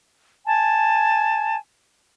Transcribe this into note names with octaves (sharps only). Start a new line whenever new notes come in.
G#5 A5